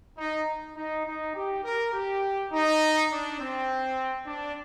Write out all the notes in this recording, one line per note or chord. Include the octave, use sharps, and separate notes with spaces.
D#4
D#4
D#4
G4
A#4
G4
D#4
D4
C4
D4